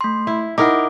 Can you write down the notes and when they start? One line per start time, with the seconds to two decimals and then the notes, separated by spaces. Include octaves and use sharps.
0.01 A3 C6
0.27 E4
0.58 D#4 E4 A#4 F#5 D6